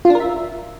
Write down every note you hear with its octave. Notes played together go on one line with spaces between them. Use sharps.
F4
D4
A#4
E5